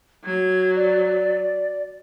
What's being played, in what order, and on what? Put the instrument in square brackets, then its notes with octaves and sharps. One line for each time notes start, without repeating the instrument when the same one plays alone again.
[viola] F#3 [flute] G#6
[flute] D5